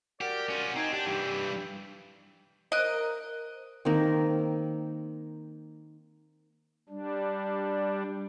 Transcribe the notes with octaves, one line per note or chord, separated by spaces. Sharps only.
F#4 G4 A#4 D5
C#4 F4
C4 D#4 G#5
D4 G4
G2 E3
A#4 C5 D#5 F#6 D7
D#3 A#3 C4
G3 D4